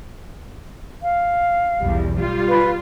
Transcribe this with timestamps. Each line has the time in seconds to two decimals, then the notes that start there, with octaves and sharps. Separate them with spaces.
1.02 F5
1.82 B1 E2 G3
2.16 G3 F4
2.48 B4